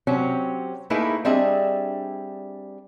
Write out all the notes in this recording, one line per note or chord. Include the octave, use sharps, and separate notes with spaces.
C3 F#3 C4 C#4
A3 A#3 D#4 E4 G#4 B4
G3 C4 D4 G#4 D#5 E5